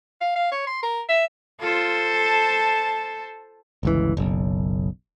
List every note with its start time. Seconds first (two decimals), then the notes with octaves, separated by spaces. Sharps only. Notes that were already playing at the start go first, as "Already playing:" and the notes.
0.21 F5
0.35 F5
0.52 C#5
0.67 C6
0.83 A#4
1.09 E5
1.60 F4 A4 C5
2.16 A5
3.83 G1 C#2 E3
4.17 F#1 B1